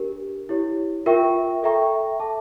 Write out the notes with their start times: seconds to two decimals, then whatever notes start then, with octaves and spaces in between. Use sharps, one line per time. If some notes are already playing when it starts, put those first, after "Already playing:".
Already playing: D4 G4 A#4
0.49 E4 G4 C#5
1.06 F4 A#4 E5 G5 C#6
1.63 A4 E5 G5 A#5 C#6
2.20 A4 E5 A5 D6